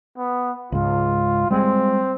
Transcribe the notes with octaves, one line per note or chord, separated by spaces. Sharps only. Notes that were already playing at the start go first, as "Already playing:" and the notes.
B3
C#2 G#2 F4
G3 G#3 C4